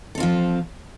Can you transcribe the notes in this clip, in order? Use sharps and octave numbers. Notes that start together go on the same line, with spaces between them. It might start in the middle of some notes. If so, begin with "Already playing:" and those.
F3 C4 F4 A4